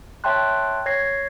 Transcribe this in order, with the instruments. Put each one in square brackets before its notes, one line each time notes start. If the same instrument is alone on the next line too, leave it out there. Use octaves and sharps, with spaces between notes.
[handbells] C#5 E5 G5 A5 C6 F#6
C#5 G#6 A#6 C7